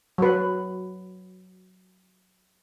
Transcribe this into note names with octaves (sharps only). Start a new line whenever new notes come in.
F#3 B4